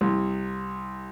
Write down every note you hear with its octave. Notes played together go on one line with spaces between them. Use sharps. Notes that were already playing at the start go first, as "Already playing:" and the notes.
C2